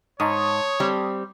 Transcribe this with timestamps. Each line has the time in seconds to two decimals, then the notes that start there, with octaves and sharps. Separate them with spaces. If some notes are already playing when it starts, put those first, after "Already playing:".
0.20 G#2 C#5 A5 C#6 D#6
0.80 G3 C4